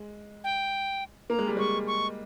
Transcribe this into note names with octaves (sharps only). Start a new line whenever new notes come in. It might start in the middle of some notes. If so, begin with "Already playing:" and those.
Already playing: G#3
G5
A#3 A#5
G#3
G3
G#3 C#6
C#6